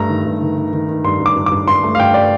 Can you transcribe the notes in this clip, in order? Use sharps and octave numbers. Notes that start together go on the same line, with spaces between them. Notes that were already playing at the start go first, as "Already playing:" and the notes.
Already playing: G2 A3 A#5
D#3
G2
D#3
D#3
D#3
D#3
G2 C6
G2
D6
G2
D6
G2
G2 C6
A3
F5
G2 G5
D5